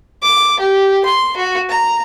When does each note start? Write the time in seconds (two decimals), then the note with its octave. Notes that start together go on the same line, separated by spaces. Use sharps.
0.22 D6
0.60 G4
1.05 C6
1.37 F#4
1.69 A#5